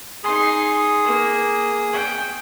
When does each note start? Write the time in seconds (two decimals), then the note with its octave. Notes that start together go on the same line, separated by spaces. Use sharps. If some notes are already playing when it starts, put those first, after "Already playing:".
0.24 D#4 G#4 C6 D#6
1.04 A#3
1.93 G5